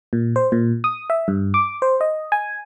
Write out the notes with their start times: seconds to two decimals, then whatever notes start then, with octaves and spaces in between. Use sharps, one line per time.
0.13 A#2
0.36 C5
0.52 A#2
0.84 D#6
1.10 E5
1.28 G2
1.54 D6
1.82 C5
2.01 D#5
2.32 G#5